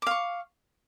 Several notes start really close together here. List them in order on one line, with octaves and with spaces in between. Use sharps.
D6 F5 C#6